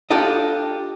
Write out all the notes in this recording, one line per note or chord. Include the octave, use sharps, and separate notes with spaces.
D4 F4 G4 A4 D#5